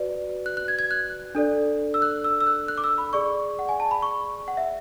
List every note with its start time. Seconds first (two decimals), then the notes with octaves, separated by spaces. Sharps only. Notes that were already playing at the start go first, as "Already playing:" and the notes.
Already playing: F#4 B4 D5
0.46 F#6
0.57 F#6
0.68 G#6
0.79 G#6
0.91 F#6
1.35 D4 A4 D5
1.94 E6
2.02 F#6
2.24 E6
2.41 E6
2.47 F#6
2.68 F#6
2.78 D6
2.84 E6
2.98 B5
3.13 G#4 D5 C#6
3.59 F#5
3.69 G#5
3.80 A5
3.91 B5
4.02 C#6
4.48 F#5
4.57 E5